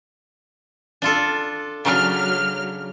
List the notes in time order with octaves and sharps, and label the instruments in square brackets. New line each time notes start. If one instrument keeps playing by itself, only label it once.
[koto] D4 F4 A4
[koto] C#3 D4 [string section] F#3 F6